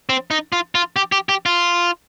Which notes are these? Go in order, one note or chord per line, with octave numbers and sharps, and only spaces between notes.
C4
D#4
F4
F4
G4
G4
G4
F4